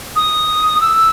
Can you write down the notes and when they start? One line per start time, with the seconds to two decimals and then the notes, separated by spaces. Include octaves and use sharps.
0.16 D#6
0.81 E6